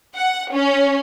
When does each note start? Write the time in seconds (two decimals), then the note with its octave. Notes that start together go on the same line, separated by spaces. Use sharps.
0.15 F#5
0.52 C#4